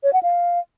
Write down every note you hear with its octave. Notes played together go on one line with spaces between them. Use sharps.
C#5
F#5
F5